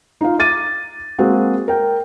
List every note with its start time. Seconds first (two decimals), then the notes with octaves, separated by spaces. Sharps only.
0.21 D#4 F4 F5
0.39 D6 A6 D#7
1.18 G#3 A#3 C4 F#4 G#4
1.68 A#4 G5